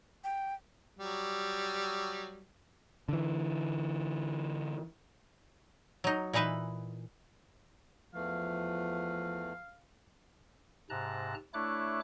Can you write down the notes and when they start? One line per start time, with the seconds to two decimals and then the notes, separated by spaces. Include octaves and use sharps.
0.24 G5
0.99 F#3 G3
3.09 D3 E3
6.04 F#3 D#4
6.33 A#2 E3 D#4 B4 E5
8.15 E2 E3 F3 A3 F5
10.90 G#2 C3 A5 A#5 F#6
11.54 A3 D4 E4 C#5 D6 F#6